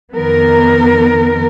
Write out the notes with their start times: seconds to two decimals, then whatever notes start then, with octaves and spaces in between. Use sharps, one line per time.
0.15 F2 D#3 B3 A#4